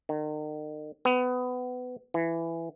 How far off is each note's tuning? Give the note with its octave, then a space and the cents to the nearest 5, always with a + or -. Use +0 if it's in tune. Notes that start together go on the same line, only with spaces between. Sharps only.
D#3 -40
B3 +20
E3 +10